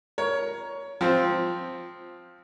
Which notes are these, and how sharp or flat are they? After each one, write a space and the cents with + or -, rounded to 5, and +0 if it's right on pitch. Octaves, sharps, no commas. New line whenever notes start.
A#4 +10 C#5 +15
F3 +10 C4 +0